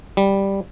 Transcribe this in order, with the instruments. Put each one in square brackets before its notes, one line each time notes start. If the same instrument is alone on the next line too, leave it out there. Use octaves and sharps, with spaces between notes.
[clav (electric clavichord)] G3